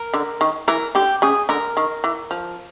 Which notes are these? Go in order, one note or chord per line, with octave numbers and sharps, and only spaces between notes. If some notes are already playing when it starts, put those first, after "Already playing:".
Already playing: A#4
D3
D#3
E3 A#4
D3 G4
C#3 G#4
D3 A#4
D#3
E3
F3